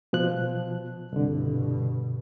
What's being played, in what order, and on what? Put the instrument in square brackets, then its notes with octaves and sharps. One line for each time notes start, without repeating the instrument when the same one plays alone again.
[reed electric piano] B2 F3 F#6
[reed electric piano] C2 D3 [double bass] G2 B2